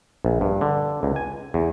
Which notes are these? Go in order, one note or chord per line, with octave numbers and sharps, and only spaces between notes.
A#1
G2
D3
C#2
G#5
E2